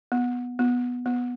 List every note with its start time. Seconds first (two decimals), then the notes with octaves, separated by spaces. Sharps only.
0.12 B3
0.59 B3
1.06 B3